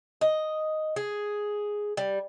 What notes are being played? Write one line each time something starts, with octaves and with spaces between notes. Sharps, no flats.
D#5
G#4
G3